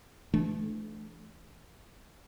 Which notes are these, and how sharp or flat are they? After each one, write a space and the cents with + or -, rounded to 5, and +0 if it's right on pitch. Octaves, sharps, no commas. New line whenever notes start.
E3 +20 A3 -30 D4 +0